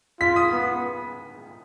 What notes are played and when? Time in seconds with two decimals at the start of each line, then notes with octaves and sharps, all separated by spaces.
0.20 F4 B6
0.36 D#6
0.52 B3